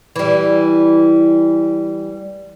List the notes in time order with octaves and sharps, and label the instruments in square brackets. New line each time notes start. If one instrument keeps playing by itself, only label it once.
[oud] E3 G3